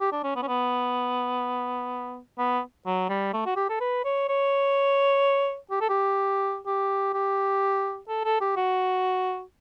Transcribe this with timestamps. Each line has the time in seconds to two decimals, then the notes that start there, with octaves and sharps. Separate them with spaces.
0.01 G4
0.12 D4
0.24 C#4
0.36 B3
0.42 C#4
0.48 B3
2.38 B3
2.86 F#3
3.09 G3
3.33 A3
3.46 F#4
3.56 G4
3.69 A4
3.80 B4
4.04 C#5
4.29 C#5
5.71 G4
5.81 A4
5.89 G4
6.66 G4
7.14 G4
8.08 A4
8.24 A4
8.41 G4
8.56 F#4